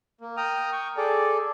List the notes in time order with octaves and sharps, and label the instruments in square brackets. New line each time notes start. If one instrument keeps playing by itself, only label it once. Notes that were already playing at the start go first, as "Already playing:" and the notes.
[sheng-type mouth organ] A#3
G5 A#5 D#6 F6
G5 C#6
G#4 A4 D5